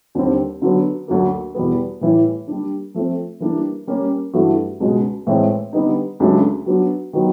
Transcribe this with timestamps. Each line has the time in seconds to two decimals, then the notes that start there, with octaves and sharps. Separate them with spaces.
0.15 D#2 D3 G3 C4
0.62 D3 F#3 B3
1.08 D2 D3 F#3 A#3
1.55 E2 B2 G3 B3
2.01 A2 E3 G3
2.48 G3 A#3 D4
2.94 F3 A3 C4
3.40 E3 G3 A#3 D4
3.87 G3 A#3 C#4
4.34 G2 E3 A3 D4 F#4
4.80 C#2 B2 G#3
5.27 A2 E3 G#3 C4
5.73 D3 G3 B3 D#4
6.20 C#2 C#3 F#3 A3 D4
6.66 F#3 B3 D4 F#4
7.13 D#3 F#3 B3